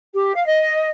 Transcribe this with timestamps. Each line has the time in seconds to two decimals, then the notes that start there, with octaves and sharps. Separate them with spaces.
0.14 G4
0.35 F5
0.46 D#5